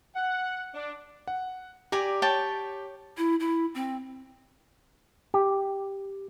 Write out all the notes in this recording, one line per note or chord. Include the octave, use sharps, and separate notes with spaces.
F#5
D4
F#5
G4 D5 G#5 A#5
C#5 G5 A5
E4
E4
C4
G4